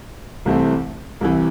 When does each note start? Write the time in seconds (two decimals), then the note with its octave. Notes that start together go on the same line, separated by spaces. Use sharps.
0.45 C2 C3 E3 A3 C4
1.21 C2 C3 E3